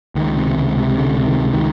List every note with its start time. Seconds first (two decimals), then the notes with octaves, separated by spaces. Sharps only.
0.15 C#2 D#3
0.36 C3
0.57 C#2
0.78 C3
0.98 C#2 D3
1.18 C3
1.25 D#3
1.39 C#2
1.53 D#3